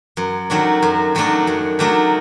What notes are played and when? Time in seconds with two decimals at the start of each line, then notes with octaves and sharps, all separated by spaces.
0.17 F#2
0.50 D#3 F#3 A3 D4
0.83 F#2
1.15 D#3 F#3 A3 D4
1.47 F#2
1.79 D#3 F#3 A3 D4